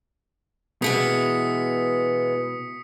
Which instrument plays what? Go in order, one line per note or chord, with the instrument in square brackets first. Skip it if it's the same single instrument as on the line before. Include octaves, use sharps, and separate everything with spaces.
[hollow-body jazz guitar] B2 [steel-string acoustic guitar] E3 G#3 B3 [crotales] D#6 B6 C#7